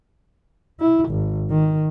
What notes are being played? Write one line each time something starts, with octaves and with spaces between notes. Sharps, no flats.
E4
G#1
D#3